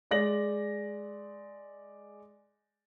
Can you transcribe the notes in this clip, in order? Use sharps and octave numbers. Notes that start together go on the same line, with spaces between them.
G#3 D5 A#6 F#7